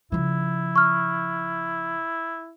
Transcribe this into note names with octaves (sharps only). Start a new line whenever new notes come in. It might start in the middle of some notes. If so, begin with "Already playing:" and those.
C#3 F3 E4
C#6 F6